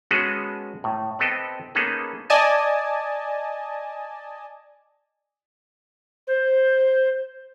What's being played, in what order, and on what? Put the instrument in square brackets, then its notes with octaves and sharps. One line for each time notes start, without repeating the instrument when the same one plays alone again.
[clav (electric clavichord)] G#3 B3 C#4 F#4 G#4 A4
A2
B3 C4 G4 A4 D#5
A#3 B3 C#4 D#4 G#4 A4
[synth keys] D5 D#5 G#5 A5
[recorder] C5